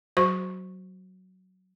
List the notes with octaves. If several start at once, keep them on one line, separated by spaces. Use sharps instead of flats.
F#3 F#4 C5 C#6